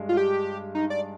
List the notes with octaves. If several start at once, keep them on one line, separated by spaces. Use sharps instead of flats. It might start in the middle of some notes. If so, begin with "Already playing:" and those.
Already playing: G2 G#3
F4
G4
D#4
D5